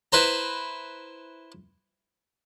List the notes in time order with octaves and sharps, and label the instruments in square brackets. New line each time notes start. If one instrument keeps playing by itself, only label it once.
[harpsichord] E4 B4 C5 A#5